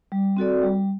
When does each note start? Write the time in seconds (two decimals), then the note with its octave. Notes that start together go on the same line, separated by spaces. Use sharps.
0.12 G3
0.37 C4 F#4 A4 D5
0.63 G3